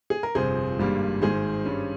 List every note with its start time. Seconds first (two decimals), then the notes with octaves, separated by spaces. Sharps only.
0.10 G#4
0.23 A#4
0.35 G1 F2 C3 F3 G#4 C5
0.79 G#1 G2 G3 A#3
1.22 G#1 G#2 D#3 G#4 C5
1.65 G2 G3 C#4